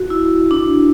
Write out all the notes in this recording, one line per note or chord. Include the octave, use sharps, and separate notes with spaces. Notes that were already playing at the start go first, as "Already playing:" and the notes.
Already playing: F#4
E4
D4